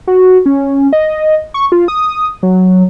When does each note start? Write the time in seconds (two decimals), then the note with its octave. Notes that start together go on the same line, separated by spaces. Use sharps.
0.07 F#4
0.46 C#4
0.93 D#5
1.54 C#6
1.72 F4
1.88 D#6
2.43 F#3